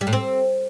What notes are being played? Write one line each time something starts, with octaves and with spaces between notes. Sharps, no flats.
G3
A2
C4